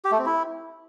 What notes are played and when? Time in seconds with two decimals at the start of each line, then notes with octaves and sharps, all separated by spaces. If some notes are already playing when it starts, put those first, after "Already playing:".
0.05 G4
0.12 A3
0.19 C4
0.26 E4